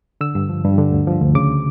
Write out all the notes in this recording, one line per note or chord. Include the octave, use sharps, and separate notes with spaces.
D3 E6
G2
F3
G2
D3
D2
F3
D2
C#3 D6